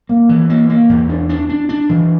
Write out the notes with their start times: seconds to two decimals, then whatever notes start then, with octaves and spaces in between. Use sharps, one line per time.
0.09 A#3
0.29 E3
0.50 A#3
0.69 A#3
0.89 E2
1.09 D4
1.29 D4
1.49 D4
1.69 D4
1.89 E3